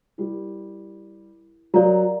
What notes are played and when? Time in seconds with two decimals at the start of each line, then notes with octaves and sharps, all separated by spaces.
0.18 G3 E4 G4 A#4
1.74 F#3 G4 A#4 D5 F5 A#5